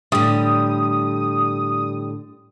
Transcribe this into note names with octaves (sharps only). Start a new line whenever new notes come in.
A2 D3 G3 D#6